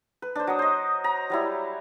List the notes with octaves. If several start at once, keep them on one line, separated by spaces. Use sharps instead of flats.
B4
D4 C5
F#3 D#6
C5 D#5
A#5
F#3 G3 E4